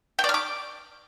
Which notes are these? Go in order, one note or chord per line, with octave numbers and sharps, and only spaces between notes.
G5
D5
F6
D6